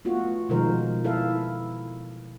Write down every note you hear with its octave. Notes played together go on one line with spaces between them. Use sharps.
A3 B3 F4 F#4
B2 D#3 F3 G#3 A#4 C5
E4 A4 B4 F5